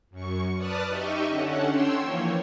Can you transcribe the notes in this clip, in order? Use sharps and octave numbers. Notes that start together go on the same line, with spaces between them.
F#2 C#6
B4 D5 A5 D#6 F6 F#6
D#4 G4 D#5 E5 C#6
D3 C#4 A4 F#5
C#5 G5 C6 E6
E3 F3 A#3 C#5